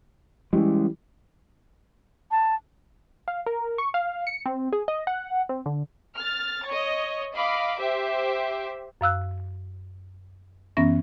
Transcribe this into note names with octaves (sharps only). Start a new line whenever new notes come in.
E3 G3 G#3 C4 C#4
A5
F5
A#4
C#6
F5
C#7
C4
G#4
D#5
F#5
C4
D3
F6 A6
C#5 D#5
D#5 F5 B5 D6
G4 C5 E5
F#2 F5 E6 F#6
F#2 E3 B3 C#4 E5 A#6